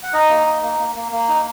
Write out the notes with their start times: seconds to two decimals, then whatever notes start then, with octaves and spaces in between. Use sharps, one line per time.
0.03 F#5
0.14 D#4 D#5
0.30 A#3
0.47 D#4
0.63 A#3
0.79 A#3
0.96 A#3
1.12 A#3
1.29 D#4